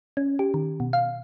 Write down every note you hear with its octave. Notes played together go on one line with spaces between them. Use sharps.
C#4
G4
D#3
B2
F5